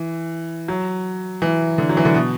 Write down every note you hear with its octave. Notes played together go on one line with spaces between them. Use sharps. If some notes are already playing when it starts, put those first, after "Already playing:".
Already playing: E3
F#3
E3
D3
F#3
E3
D3
B2